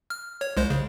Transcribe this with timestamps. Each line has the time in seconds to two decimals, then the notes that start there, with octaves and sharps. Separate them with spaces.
0.10 F6
0.41 C#5
0.57 C2 G#3 C5
0.70 C#3